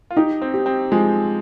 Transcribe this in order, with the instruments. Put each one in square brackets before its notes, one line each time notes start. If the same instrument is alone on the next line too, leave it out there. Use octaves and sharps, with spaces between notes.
[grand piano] F4
[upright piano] D#4 [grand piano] G4
[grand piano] C4
[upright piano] G4
[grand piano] C4
[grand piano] F3 [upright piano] G#3